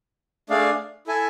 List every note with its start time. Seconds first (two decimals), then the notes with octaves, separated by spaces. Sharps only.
0.50 A3 D4 G#4 D5 F5
1.07 E4 A4 E5 G#5